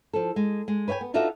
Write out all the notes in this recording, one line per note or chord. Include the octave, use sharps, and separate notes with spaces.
F3 A4
G#3
G#3
B4 C#5 D#5 G5 G#5
B3
D4 D#4 F4 F#4 A4 E5